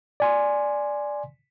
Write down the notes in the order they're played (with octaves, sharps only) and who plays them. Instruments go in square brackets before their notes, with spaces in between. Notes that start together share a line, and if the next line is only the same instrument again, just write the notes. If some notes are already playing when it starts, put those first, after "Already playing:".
[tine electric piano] D5 G#5 C6